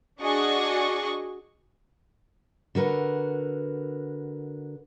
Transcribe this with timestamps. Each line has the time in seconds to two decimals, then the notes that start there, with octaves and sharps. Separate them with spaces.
0.21 D4 F#4 G#4 D5 D#5 C#6
2.75 D3 F#4 A#4 B4